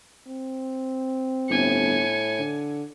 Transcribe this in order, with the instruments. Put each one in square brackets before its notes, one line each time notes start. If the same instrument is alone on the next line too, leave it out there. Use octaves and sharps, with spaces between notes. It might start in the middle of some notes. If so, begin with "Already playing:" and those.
[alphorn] C4
[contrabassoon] G1 [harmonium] A2 [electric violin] G#5 C#7
[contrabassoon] D3